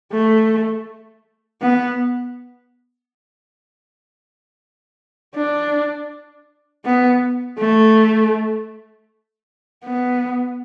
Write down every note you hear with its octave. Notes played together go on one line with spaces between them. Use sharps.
A3
B3
D4
B3
A3
B3